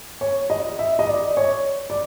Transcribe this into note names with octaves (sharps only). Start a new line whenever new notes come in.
C#5
D#5
E5
D#5
D5
C#5
D5